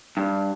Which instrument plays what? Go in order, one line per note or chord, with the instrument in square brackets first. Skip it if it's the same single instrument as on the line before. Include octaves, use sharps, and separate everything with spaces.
[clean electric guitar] G2